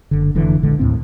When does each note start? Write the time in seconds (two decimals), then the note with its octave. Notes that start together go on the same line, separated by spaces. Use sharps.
0.11 F#1 D3
0.35 F1 F2 D3 E3
0.62 A#1 D3 G#3
0.79 D#2 A2 C4